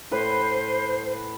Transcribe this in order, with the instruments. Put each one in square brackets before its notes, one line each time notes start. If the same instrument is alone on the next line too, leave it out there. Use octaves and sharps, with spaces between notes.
[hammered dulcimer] A2 B4 [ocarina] C5